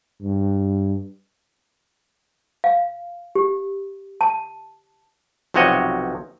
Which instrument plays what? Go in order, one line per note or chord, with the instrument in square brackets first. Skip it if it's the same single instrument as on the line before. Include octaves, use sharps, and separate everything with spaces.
[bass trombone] G2
[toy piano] F5
G4
A5
[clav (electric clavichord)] B1 C3 F3 F#4 C#5 D#5